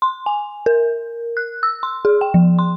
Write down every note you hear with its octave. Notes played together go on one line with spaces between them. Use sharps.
C6
G#5
A#4
F#6
E6
C6
G#4
G5
F3
C6